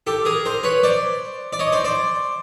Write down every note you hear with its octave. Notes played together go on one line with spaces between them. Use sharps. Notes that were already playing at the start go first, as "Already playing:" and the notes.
G4 A4
G#4 A#4
A#4 C5
B4 C#5
C5 D5
D5
C#5 D#5
C5 D5
C5 D5